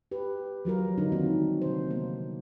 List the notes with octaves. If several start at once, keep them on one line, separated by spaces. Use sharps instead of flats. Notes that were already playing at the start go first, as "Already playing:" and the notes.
G4 B4
F3 F#3 F4 A#4
D3 D4 D#4 F4
D#3 G3 A#3 C4 F4 F#4
C3 C5
A#3 B3